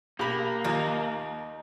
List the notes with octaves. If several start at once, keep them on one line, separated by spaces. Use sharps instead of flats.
B1 A#3 G4 B5
D#2 D#4 F4